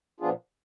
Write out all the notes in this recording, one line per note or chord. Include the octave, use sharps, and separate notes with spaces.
A#2 F3 B3 D4 F4 G#4